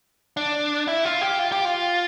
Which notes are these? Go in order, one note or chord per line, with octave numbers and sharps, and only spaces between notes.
D4
E4
F4
G4
F4
G4
F4